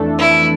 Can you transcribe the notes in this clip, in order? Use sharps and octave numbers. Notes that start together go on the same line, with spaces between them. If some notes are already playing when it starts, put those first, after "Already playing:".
Already playing: F2 E3 A3 D4 A4
E4